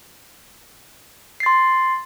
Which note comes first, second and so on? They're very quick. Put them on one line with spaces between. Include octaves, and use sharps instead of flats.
C7 A6 C6